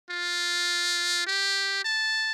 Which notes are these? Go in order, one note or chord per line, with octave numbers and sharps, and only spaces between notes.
F4
G4
A5